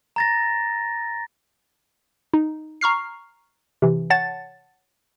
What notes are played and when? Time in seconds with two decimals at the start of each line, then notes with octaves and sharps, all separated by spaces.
0.16 A#5 A6 A#6
2.34 D#4
2.81 A#5 C#6 F6 C7
3.82 C3 E3
4.10 C#5 F#5 A5 A6